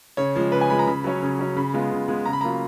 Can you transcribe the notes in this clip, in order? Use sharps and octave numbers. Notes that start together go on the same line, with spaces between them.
C#3 C#5
F3 G#3
C#3 B4
G#5
F3 G#3 B5
A#5
C#3 B5
F#3 C#4
C#3
F#3 C#4
C#3 B5
G#3 B3 F4
C#3
G#3 B3 F4
C#3 A#5
B5
F#3 A#3 F4 A#5